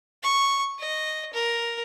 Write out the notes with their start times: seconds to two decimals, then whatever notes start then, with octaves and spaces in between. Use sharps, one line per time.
0.23 C#6
0.79 D#5
1.33 A#4